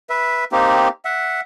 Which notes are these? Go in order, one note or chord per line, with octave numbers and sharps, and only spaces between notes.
B4 E5
A#3 C4 D#4 G4
E5 F#5